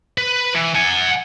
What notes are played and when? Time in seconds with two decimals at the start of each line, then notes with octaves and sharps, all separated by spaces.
0.18 B4
0.55 E3
0.75 F#5 G#5